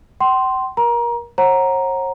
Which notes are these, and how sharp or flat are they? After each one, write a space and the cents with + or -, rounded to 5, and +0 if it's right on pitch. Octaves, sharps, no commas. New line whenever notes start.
G5 -45 C6 +0
A#4 +25 A#5 +25
C#5 -45 F#5 +0 A#5 +0